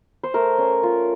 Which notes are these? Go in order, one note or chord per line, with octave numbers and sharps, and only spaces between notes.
C5
A3 A#4
C#4
F4